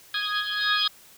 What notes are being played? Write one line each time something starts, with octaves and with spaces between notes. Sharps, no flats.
D#6 G#6